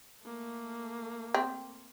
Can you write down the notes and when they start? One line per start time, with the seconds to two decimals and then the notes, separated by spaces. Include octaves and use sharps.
0.24 A3 A#3
1.35 C4